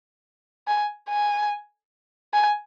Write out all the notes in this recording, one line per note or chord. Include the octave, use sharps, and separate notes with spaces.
G#5
G#5
G#5